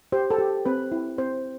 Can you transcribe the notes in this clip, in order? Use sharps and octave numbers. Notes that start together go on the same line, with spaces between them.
G4 C5
A4
G4
C4 B4
E4
C4 C5